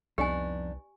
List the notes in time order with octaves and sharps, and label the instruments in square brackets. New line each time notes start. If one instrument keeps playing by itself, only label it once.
[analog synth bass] C2 [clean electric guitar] F2 [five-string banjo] B3 D4 D#4 [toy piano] G4 G#5